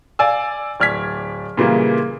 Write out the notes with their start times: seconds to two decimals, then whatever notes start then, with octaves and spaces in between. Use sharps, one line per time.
0.19 D5 F5 G#5 E6
0.80 D1 D5 F6 G#6 B6
1.57 A#2 C#3 E3 G3 A#3